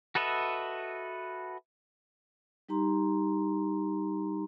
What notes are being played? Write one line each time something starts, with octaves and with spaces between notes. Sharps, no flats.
F#4 A4 B4 D#5 E5
G3 D#4 G4 A#5 C6